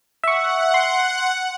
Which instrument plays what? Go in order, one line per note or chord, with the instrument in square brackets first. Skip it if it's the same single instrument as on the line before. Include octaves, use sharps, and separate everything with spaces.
[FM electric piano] E5 C#6 [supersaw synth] F#5
[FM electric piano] C6